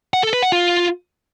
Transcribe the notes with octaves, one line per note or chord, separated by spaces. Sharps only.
F#5
A4
B4
F#5
F4